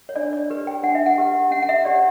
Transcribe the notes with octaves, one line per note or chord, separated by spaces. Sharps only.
C#5
D4 D5
D5
G4 B4
G5
D4 F#5
E5
F#5
G4 B4
C#4 F#5
F#5
E5
G4 C#5 D5